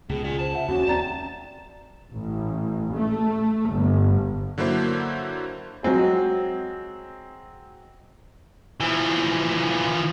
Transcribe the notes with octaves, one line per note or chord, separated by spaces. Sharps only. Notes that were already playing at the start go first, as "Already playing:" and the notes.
C#2 B2 G#4
F4 D5 G#5
C5 A5
E5 F#5
D#2 C#4 F#4
D#2 C4 D5 A#5 A6
A1
A3
G1
D3 F#3 A#3 E4 C5
F#3 G#3 C4 G#4
E3 F3